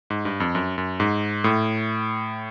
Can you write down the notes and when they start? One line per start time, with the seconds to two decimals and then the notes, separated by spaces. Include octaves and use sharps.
0.10 G#2
0.25 G2
0.40 F2
0.55 F#2
0.78 F#2
1.00 G#2
1.44 A2